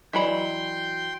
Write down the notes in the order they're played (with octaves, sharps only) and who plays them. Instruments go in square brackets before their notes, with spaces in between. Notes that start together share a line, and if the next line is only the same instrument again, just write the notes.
[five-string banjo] E3 F#3 B5 [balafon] D5 D#5 [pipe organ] G5 C6